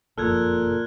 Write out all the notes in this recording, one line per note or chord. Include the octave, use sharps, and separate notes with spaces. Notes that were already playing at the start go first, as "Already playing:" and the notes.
F#1 F2 A#2 A4 F6 F#6 G#6